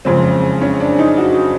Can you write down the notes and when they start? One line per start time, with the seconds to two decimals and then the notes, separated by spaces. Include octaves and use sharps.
0.05 F#1 F2 C#3 F3 G#3 C4
0.61 C#4
0.80 D4
0.99 D#4
1.18 F#4